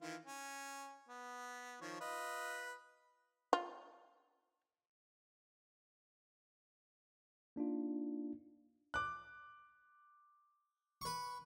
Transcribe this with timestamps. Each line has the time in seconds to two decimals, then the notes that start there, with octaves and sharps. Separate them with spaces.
0.01 D#3 E3 F4
0.25 C#4
1.09 B3
1.81 D#3 F3 C#5
2.01 F4 B4 D#5
3.53 F4
7.56 A#3 D4 D#4 F4
8.94 D6 F#6
11.01 B4 C#6